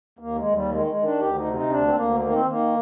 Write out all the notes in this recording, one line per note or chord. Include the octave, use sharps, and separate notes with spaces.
D#2 A#3
G#3
D#2
G3
D#3 G#3
G#3
D#3
D4
D2 G4
D#4
C3
D#4
D2 D4
C4
D2 A#3
D#3 A#3
C4
D#3 A#3